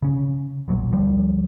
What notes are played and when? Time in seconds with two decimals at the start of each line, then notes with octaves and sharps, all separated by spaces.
0.02 C#3 C#4
0.68 E1 A#1 A#2 F#3
0.92 D2 F3 G3